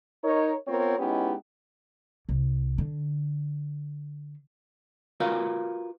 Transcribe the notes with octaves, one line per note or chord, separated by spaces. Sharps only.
D#4 A#4 C#5
B3 C4 F4 A#4 C#5
G#3 B3 C#4 D#4 E4 G4
C2
D3
F4 F#4 A#4 B4 F5